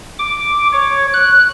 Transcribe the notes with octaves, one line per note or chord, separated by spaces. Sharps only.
D6
C#5
F#6